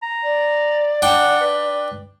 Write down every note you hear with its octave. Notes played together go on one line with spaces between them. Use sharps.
A#5
D5
D4 F#5 G5
B4